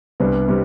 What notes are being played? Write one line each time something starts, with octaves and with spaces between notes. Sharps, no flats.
C2 C3 G3 B3 D4
C3 G3